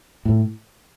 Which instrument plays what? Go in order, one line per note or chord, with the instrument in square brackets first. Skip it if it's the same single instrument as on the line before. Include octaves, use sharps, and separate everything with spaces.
[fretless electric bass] A2